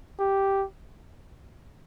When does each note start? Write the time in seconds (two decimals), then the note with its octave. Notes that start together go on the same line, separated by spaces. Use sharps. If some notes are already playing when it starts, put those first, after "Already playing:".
0.19 G4